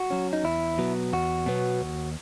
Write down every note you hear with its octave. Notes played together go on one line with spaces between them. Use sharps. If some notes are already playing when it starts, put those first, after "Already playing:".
Already playing: F#4
F#3 C#4
D#4
E2 E4
B2 F#3 B3
E2 F#4
B2 F#3 B3
D#2